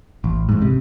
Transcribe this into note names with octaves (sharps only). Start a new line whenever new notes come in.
A1
A1 G#2
C3